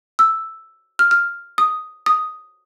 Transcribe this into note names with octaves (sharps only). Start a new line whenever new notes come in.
E6
F6
F6
D#6
D#6